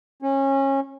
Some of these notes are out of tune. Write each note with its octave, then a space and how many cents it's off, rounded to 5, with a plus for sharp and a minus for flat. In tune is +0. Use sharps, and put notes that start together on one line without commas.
C#4 -25